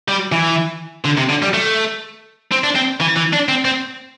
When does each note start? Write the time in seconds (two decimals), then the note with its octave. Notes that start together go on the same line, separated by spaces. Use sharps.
0.08 G3
0.32 E3
1.05 D3
1.18 C3
1.29 D3
1.42 G3
1.54 A3
2.51 C4
2.64 D4
2.76 C4
3.01 E3
3.17 E3
3.33 D4
3.49 C4
3.65 C4